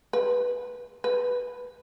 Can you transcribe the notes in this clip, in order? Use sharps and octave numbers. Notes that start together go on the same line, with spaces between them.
B4
B4